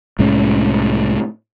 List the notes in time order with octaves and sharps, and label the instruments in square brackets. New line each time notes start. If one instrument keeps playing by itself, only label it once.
[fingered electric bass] C2 A2 G#3 C#4